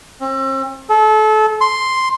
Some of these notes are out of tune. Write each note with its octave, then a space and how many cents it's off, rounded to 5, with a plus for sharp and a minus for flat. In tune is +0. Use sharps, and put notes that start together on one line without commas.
C4 +40
A4 -30
C6 +0